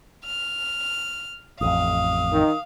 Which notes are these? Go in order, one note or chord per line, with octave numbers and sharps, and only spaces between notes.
F6
A1 F2 F5 D#6
D#3